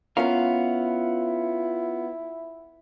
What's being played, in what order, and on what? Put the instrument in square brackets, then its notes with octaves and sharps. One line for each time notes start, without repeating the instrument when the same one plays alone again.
[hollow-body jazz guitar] B3 C#4 A#4 [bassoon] E4 [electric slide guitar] F4 C#5 F5